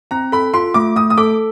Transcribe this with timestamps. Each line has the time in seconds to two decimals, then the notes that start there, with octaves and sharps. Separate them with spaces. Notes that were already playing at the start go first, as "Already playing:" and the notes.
0.11 C4 A#5
0.32 A4 B5
0.54 F4 C6
0.74 A3 D6
0.96 A3 D#6
1.10 D#6
1.18 A4 D6